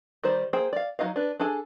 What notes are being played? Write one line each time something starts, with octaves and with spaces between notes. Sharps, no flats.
D#3 G3 D#4 C5 D5
A#3 G#4 C5 G5
D5 F5
F#3 G#3 D#4 D#5 F5
D4 B4
D4 G#4 A4 G#5